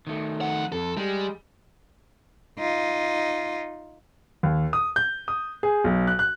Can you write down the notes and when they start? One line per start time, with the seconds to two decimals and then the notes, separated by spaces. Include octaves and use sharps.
0.07 D#3 A3
0.41 F2 F#5
0.72 F2 A4
0.97 G3 G#3
2.59 D#4 F4
4.43 D#2
4.73 D#6
4.96 G6
5.28 D#6
5.63 G#4
5.84 B1
6.07 F#6
6.19 F#6